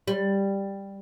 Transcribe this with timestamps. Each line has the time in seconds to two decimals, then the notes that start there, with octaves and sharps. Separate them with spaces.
0.08 G3